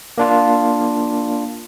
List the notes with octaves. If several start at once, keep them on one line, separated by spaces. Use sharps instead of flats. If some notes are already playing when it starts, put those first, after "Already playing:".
A#3 D4 F4